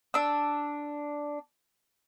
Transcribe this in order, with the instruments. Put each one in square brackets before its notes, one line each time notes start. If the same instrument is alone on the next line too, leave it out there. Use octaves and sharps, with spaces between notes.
[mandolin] D4 E6